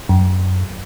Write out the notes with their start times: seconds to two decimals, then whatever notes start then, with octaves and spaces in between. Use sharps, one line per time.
0.09 F#2